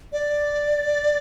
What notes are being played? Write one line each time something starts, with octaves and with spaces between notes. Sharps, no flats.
D5